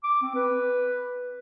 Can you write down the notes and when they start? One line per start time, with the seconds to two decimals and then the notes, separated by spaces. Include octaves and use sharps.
0.03 D6
0.22 C4
0.35 B4